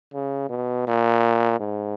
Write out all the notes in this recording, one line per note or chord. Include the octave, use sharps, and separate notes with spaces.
C#3
B2
A#2
G#2